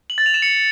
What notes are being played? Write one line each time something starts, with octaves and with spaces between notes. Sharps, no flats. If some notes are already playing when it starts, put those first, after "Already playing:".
F#7
A6
F7
E7
C#7